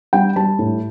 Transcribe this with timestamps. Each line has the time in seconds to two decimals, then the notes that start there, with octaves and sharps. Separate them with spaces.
0.13 G3 G5
0.36 G3 A5
0.59 A2